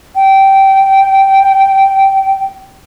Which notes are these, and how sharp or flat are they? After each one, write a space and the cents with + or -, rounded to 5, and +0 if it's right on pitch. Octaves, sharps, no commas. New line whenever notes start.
G5 -15